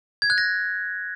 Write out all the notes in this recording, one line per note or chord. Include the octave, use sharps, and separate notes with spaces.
G#6
F#6
A#6